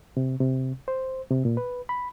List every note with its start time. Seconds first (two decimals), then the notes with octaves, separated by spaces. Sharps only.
0.17 C3
0.41 C3
0.88 C5
1.30 C3
1.45 A#2
1.57 B4
1.89 B5